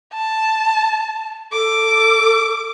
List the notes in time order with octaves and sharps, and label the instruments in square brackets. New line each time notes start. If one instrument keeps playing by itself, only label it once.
[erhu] A5
[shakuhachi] A4 [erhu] D6